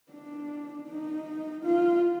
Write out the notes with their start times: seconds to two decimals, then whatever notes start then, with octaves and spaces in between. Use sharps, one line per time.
0.12 D4
0.88 D#4
1.64 F4